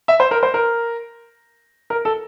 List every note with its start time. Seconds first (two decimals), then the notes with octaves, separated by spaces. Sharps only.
0.08 E5
0.20 C5
0.31 A#4
0.43 C5
0.54 A#4
1.90 A#4
2.05 A4